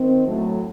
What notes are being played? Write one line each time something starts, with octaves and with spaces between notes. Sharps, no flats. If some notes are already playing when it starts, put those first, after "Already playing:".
Already playing: D#3 C4
A2 F#3 A3